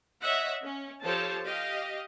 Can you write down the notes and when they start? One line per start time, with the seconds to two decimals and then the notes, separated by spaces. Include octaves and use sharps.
0.21 C#5 D#5 E5 F#5
0.63 C#4
1.04 F3 G4 A4 C5 C#5 A5
1.45 G4 D#5 F5